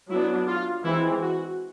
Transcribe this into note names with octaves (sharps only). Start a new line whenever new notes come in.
F#3 B3 D4 E4
F4
E3 G#3 C4 E4
F#4